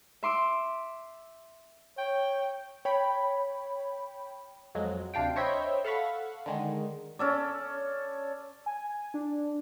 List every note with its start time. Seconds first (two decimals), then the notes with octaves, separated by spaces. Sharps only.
0.23 E5 C6 D6 E6
1.98 C#5 G5
2.85 C#5 G5 B5
4.75 F2 F#3 G#3
5.14 D2 C3 D4 F5 G5
5.36 C5 C#5 D#5 E5 G5 B5
5.84 A4 F5 F#5 B5 C#6
6.46 D3 D#3 G#3
7.19 C#4 A4 D5
8.66 G#5
9.14 D4